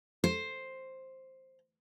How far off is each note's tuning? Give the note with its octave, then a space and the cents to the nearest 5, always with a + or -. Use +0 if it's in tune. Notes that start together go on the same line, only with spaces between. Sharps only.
C5 +5